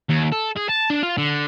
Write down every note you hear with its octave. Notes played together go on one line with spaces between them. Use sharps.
D#2
A4
G#4
A5
D4
F4
D3